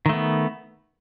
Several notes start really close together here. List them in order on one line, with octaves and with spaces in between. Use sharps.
D#3 A3 B3